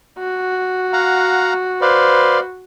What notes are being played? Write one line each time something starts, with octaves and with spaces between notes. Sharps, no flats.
F#4
F5 F#5 A#5
B4 C5 D5 F5